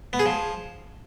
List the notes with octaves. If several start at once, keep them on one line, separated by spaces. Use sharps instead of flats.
B3
G#4
F3